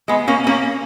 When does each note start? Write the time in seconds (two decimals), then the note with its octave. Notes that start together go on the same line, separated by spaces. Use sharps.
0.08 G#3 B3
0.28 A#3 C#4
0.47 A#3 C#4